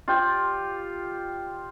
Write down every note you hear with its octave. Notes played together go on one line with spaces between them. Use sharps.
F4 G4 D5 G5